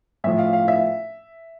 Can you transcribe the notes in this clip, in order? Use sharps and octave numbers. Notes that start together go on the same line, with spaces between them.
A2 F3 E5
F5
F5
E5